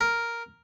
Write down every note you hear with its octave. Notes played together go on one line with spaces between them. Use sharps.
A#4